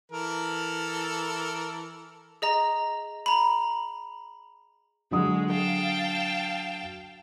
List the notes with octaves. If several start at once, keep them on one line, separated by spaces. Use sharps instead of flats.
E3 A4 A#4
G#4 D#5 A#5
A#5 B5
D3 F#3 G#3 D#6
F5 G5 A5